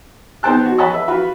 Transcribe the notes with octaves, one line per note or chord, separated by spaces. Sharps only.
B3 D#4 C5 G5 A5 F#6
F#4
C#5 D#5 F#5 A5 B5
B4 E5
F4 F#4 B4